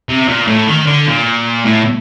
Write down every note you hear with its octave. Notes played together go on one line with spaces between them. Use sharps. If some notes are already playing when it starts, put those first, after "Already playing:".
C3
A#2
A2
D#3
D3
A#2
A2